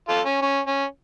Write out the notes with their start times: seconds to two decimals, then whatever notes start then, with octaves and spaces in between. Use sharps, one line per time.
0.09 F4 A4
0.25 C#4
0.42 C#4
0.67 C#4